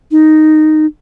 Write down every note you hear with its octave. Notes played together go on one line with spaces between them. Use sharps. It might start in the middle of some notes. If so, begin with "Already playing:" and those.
D#4